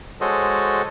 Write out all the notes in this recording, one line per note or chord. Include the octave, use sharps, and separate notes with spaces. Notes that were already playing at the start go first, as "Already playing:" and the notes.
G#3 F#4 A4 C5 C#5 D#5